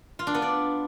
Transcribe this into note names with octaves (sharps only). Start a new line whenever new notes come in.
F4
D4
B3
D5